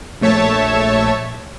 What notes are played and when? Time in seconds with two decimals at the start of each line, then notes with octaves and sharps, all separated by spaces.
0.21 A#1 A3 C#5 E5 A5